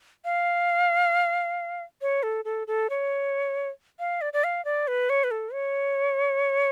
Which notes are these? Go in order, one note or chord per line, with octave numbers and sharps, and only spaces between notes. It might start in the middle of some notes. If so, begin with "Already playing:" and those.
F5
C#5
A4
A4
A4
C#5
F5
D5
D5
F5
D5
B4
C#5
B4
A4
C#5